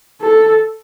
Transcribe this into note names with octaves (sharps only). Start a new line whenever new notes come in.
A4